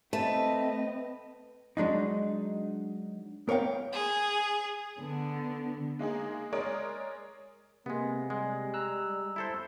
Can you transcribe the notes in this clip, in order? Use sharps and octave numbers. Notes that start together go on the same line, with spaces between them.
A3 C4 B4 D#5 A5
F#3 G#3 D4 D#4
B3 A#4 C#5 F5 G5
G#4
D3 B3
G#3 A#3 D#4 G#4
G#3 A#4 C#5 D5 D#6 D7
C3 G#3 A#3 B3
G3 G#3
A#5 E6 F#6
E4 A4 C5